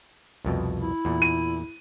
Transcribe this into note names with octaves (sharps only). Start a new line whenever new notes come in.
C2 F2 B2
E4
E2 A#2
D#7